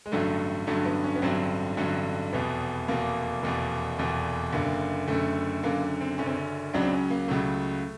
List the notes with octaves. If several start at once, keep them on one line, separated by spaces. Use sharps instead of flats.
G#3
A1 G2 D3 F#3 A3
A1 G2 D3 F#3 A3
B3
C#4
B3
A1 G2 D3 F#3 C4
A1 G2 D3 F#3
F1 E2 B2 B3
F1 E2 B2 A#3
F1 E2 B2 A#3
F1 E2 B2
F#1 F#2 D3 A#3
F#1 F#2 D3 A3
F#1 F#2 D3 A#3
C4
F#1 F#2 D3 C#4
C4
C#4
C#2 C#3 F#3 D4
C4
C#4
A#3
C#2 C#3 F#3 A3